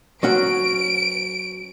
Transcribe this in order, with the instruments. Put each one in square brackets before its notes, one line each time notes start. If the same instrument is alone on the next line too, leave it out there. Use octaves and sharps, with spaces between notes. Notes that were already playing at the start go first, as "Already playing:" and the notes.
[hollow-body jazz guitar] F#3 C#4 F#5 [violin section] D7